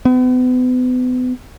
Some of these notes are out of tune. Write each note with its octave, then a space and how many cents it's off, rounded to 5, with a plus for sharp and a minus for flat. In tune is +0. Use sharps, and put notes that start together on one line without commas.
B3 +35